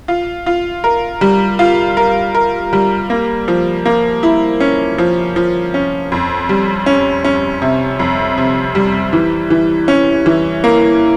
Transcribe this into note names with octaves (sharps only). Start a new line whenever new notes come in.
F4
F4
A#4
G3
F4
A#4
A#4
G3
A#3
F3
A#3
E4
C#4
F3
F3
C#4
F2
G3
C#4
C#4
C3
F2
C3
G3
E3
E3
C#4
E3
A#3